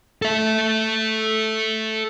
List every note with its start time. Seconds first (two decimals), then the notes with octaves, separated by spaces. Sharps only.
0.22 A4 E5